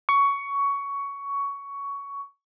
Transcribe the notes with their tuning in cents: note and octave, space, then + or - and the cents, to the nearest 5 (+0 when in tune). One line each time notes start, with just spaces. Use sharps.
C#6 +15